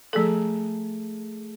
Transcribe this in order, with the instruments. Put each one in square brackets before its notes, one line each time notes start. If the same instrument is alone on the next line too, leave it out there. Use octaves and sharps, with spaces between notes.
[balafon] F3 A4 [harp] A3 G#4 A#5